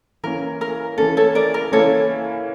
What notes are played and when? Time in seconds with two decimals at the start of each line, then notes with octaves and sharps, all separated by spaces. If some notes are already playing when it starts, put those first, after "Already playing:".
0.23 E3 A#3 C#4 A#4
0.61 A#4
0.98 E3 A#3 C#4 A4
1.17 A4 C#5
1.35 A#4 D5
1.54 A#4
1.72 E3 A#3 C#4 A4 C#5